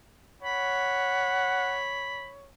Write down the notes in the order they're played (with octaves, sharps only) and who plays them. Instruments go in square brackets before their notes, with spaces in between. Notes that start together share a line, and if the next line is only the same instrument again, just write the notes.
[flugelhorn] C#5 [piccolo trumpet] F#5 [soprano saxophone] B5